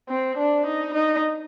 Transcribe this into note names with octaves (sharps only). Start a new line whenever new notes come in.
C4
D4
D#4
D#4